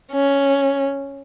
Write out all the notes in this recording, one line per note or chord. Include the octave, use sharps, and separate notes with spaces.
C#4